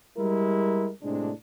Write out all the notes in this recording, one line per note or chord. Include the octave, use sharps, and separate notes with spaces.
G3 G#3 E4 A#4
A2 C3 G#3 D4